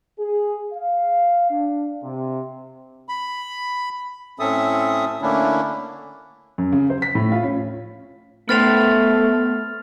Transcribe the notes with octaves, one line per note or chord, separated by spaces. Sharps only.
G#4
F5
D4
C3
B5
A2 C4 C#4 A4 E5 D#6
D3 A3 A#3 C#4 D4 E4
F#2
C#3
C5
B6
A2
F4
C#4
A3 B3 B4 C5 F6 A6 F7